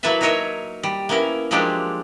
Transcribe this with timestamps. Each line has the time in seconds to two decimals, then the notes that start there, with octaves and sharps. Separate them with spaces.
0.03 F#3 A#3 E4 A4 B4 E5
0.21 D#4 F#4 A#4 C#5 D#5 E5
0.83 G3
1.09 A#3 B3 C#4 E4 A#4
1.51 F3 F#3 G#3 A#3 D4 G4